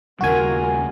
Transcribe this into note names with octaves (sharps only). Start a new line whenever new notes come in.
D#2 C#3 G3 F4 F#4 A#4 G#5